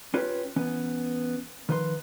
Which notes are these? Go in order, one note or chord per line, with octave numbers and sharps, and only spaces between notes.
C#4 F4 G4 B4 C#5
E3 B3 C#4
D#3 F3 B4 D5 C6